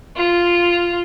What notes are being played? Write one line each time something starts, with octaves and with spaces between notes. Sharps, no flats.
F4